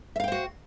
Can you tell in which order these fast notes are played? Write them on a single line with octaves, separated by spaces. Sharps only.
E5 F5 G5 C5 F#4